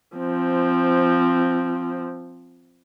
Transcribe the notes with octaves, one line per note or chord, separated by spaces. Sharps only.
F3 C4